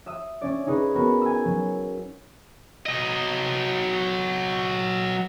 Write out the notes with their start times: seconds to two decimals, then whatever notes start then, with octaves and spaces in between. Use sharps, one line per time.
0.06 E5 D#6 E6
0.41 C#4 D5
0.67 C#4 D#4 G#4 B4
0.95 B3 F#4 A#4 B4
1.22 G#5 E6
1.45 F#3
2.86 F#3 D#5